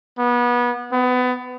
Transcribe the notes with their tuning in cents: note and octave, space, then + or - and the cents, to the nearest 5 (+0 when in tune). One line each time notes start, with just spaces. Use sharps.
B3 -25
B3 +25